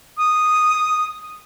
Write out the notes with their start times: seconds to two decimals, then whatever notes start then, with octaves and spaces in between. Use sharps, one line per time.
0.18 D#6